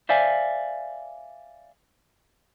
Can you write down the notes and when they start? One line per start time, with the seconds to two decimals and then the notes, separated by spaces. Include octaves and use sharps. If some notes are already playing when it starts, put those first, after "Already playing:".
0.09 C5 D5 E5 F5 G#5